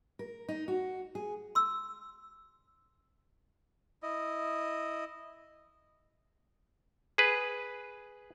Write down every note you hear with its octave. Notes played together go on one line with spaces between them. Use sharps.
A#4
D#4
F#4
G#4
C6 E6
E4 D#5
G#4 B4